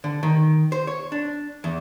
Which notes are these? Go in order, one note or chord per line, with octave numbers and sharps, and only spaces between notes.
D3
D#3
C5
C#5
D4
E2